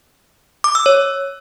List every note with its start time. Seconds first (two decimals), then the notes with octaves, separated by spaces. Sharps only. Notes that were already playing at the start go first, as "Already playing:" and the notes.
0.64 D6
0.75 E6
0.86 C#5